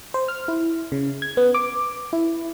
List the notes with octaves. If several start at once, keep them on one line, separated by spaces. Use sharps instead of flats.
C5
F6
E4
C#3
G#6
B3
D6
E4